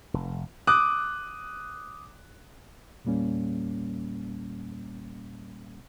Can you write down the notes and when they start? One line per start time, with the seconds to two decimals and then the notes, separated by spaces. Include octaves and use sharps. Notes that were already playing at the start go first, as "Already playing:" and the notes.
0.14 F1
0.67 D6 D#6 F#6
3.05 E2 A#2 G3 A#3 C#4